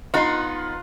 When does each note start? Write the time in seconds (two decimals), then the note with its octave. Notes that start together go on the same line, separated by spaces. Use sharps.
0.14 B3 D#4 F4 F#5 C6